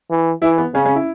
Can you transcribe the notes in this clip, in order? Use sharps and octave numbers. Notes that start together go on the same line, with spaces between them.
E3
E3 E4
B3
C#3 C#4
C#4
E4